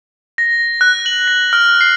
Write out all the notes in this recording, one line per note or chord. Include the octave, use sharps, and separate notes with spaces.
A#6
F#6
F#7
A#6
F6
C7